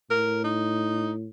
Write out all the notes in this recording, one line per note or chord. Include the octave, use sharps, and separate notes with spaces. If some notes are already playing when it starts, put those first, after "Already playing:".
A2 A#4
D#4